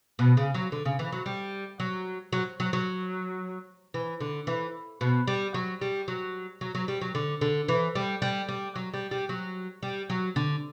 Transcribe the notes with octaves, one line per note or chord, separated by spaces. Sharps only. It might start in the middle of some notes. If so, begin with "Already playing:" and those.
B2
C#3
F#3
D3
C#3
E3
F#3
G3
F#3
F#3
F#3
F#3
E3
D3
E3
B2
G3
F#3
G3
F#3
F#3
F#3
G3
F#3
D3
D3
E3
G3
G3
G3
F#3
G3
G3
F#3
G3
F#3
D3